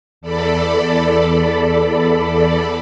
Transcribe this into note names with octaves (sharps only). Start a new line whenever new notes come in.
E2 A4 D5 B5